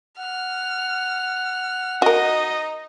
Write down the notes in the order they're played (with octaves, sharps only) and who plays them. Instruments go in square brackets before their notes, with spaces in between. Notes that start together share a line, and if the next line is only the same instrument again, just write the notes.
[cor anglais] F#5 [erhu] F6
[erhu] D#4 [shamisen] F#4 A#4 [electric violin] D#5